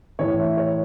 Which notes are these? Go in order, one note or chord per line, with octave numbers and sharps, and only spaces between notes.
A2 E3 C#5
E5
C#5